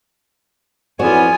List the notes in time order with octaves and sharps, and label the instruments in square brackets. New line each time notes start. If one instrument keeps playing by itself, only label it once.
[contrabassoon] F2 [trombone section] E3 B3 [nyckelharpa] F4 G#5 [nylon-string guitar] F#4 C#5 D5